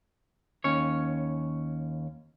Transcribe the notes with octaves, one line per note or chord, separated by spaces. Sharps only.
D#2 C#4 C#5